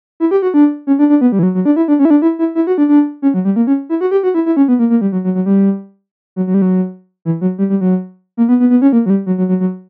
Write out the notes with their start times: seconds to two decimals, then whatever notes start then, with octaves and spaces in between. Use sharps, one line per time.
0.20 E4
0.31 G4
0.42 F#4
0.54 D4
0.87 C#4
0.99 D4
1.09 D4
1.21 B3
1.32 G3
1.39 E3
1.43 F#3
1.55 F#3
1.65 D4
1.76 E4
1.88 D4
1.99 C#4
2.05 E4
2.10 D4
2.22 E4
2.39 E4
2.55 E4
2.67 F#4
2.78 D4
2.89 D4
3.22 C#4
3.34 F#3
3.45 G3
3.56 A#3
3.67 C#4
3.89 E4
4.01 F#4
4.11 G4
4.23 F#4
4.34 E4
4.46 E4
4.57 C#4
4.68 B3
4.79 A#3
4.90 A#3
5.01 G3
5.12 F#3
5.24 F#3
5.35 F#3
5.46 G3
6.36 F#3
6.47 F#3
6.54 G3
6.62 F#3
7.25 E3
7.41 F#3
7.58 G3
7.70 G3
7.81 F#3
8.37 A#3
8.49 B3
8.60 B3
8.70 B3
8.82 C#4
8.93 A#3
9.06 F#3
9.10 G3
9.26 F#3
9.38 F#3
9.49 F#3
9.60 F#3